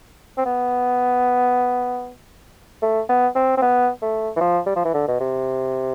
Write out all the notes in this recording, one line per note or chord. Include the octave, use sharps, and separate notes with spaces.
C4
B3
A3
B3
C4
C4
B3
A3
E3
F3
G3
F3
E3
D3
B2
C3